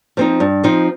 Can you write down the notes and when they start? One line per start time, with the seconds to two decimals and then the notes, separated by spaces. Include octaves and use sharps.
0.17 F3 C4 D#4
0.40 G2
0.63 F3 C4 D#4